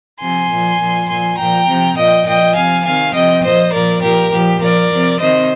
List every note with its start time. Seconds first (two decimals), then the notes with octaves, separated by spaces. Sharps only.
0.21 C3 F3 G#5 C6
0.50 A#2 F3
0.80 A#2 F3
1.09 A#2 F3 G#5 C6
1.38 A#2 F3 G5 A#5
1.67 C3 F3
1.96 A#2 F3 D#5 G5
2.26 A#2 F3 D#5 G5
2.55 C3 F3 F5 G#5
2.84 C3 D#3 F5 G#5
3.14 C3 F3 D#5 G5
3.43 A#2 F3 C5 D#5
3.72 A#2 F3 A#4 D5
4.02 A#2 F3 G4 A#4
4.31 A#2 F3 G4
4.60 A#2 F3 A#4 D5
4.90 C3 F3
5.19 C3 D#3 C5 D#5